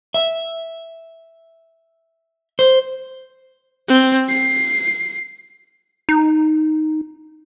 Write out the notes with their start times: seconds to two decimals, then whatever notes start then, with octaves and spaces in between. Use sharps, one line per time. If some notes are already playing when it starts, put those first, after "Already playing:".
0.14 E5
2.59 C5
3.89 C4
4.29 C7
6.09 D#4